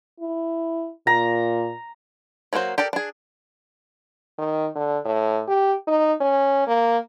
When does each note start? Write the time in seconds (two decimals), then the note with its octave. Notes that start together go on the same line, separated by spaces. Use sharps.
0.20 E4
1.07 A#2 A#5
2.53 F#3 A#3 D4 F#4 C5
2.78 G4 A4 A#4 D5
2.93 D4 G#4
4.39 D#3
4.76 D3
5.05 A2
5.48 G4
5.87 D#4
6.21 C#4
6.67 A#3